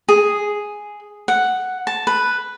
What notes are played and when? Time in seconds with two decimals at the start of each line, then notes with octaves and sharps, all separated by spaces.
0.09 G#4
1.28 F#5
1.87 A5
2.07 B4